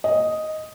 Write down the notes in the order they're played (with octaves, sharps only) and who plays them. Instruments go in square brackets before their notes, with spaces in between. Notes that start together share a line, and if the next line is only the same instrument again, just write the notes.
[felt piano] D#5